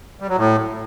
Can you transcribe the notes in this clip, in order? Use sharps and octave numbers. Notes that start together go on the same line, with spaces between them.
G3
F#3
A2